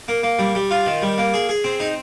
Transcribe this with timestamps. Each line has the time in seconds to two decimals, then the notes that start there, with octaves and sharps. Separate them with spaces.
0.08 A#3
0.23 A#3
0.39 G3
0.55 G3
0.71 F4
0.86 D#3
1.02 G3
1.18 A#3
1.34 G#4
1.49 G#4
1.64 C4
1.80 D#4